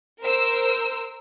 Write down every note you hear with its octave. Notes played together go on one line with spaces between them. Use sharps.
A#4 C5 E6